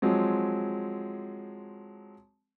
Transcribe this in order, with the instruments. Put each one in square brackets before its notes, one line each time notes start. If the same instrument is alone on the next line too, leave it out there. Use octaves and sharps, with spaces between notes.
[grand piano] F3 F#3 G#3 C4